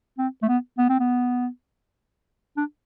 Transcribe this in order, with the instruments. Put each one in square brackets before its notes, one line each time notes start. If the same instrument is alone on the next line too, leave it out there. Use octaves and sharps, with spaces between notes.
[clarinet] C4
A3
B3
B3
C4
B3
D4